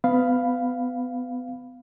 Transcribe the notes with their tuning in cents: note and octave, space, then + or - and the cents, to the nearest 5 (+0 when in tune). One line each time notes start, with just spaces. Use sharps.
B3 +30 F5 +0 B5 +0